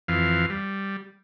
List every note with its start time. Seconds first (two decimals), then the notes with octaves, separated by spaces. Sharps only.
0.08 F2 E3 F5
0.50 G3